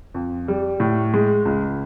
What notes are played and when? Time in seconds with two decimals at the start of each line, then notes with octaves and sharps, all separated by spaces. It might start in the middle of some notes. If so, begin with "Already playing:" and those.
0.14 F2
0.48 G3
0.80 A2
1.14 G#3
1.45 C#2